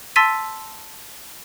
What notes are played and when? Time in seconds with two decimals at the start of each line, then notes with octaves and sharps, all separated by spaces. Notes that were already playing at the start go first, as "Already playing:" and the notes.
0.16 A5 C6 E6 A6 B6 D#7